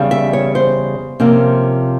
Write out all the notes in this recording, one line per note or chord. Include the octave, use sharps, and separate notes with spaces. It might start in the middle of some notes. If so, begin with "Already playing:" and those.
Already playing: E2 C#3 G3
E5
C#5
C5
C3 F3 A#3 C#4